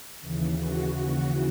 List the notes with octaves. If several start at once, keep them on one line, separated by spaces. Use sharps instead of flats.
D#2 C#3 E3
F#4
F#4